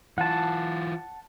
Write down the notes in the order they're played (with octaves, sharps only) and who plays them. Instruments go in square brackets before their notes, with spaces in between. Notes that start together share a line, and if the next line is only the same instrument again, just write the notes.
[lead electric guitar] E3 F4 [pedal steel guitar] F#5 A5